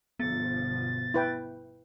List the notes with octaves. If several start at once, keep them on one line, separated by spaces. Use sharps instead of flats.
G1 B2 F3 B3 A6
E4 B4 G5